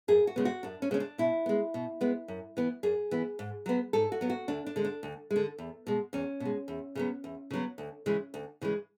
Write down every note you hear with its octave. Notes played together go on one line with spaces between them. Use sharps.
F#2 G#4
F#4
C#3 G#3 B3
F#4
F#2 D4
C#4
C#3 G#3 B3 C#4
D4
B2 E4
G#3 B3
B2
G#3 B3
F#2
E3 B3
F#2 G#4
E3 B3
G#2
F#3 B3
G#2 A4
F#4
F#3 B3
F#4
D2 D4
D4
D3 G#3
D4
D2
G#3
D3
E2
B2 G#3
E2 C#4
B2
G#3
E2
C#3 F#3 B3
E2
C#3 F#3 B3
D2
C#3 E3 G#3
D2
C#3 E3 G#3